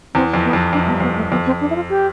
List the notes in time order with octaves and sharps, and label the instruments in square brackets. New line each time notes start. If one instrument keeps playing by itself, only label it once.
[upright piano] E2 [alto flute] C4
[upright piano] F2
[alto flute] B3
[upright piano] F2
[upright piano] F2 [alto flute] D4
[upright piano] G2 [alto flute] B3
[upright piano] F2 [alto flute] B3
[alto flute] A3
[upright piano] F2 [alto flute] B3
[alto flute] C4
D4
E4
F4
G4